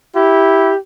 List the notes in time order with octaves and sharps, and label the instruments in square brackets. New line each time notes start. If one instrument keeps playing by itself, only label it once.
[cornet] E4 [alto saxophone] G4